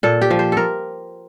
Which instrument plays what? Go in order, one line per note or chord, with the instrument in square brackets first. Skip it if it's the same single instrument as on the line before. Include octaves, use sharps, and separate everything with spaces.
[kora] A#2 A4
G4
F3
C5
A4 A#4